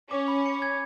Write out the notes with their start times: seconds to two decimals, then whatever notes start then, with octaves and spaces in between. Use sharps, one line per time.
0.10 C#4 D6
0.28 B5
0.46 C#7
0.62 G#6